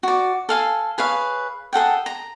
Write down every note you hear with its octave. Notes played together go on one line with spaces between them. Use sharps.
F#4 D5
A4 F5 G#5
G#4 B4 C#5 F5
G#4 A4 F#5 G5
A#5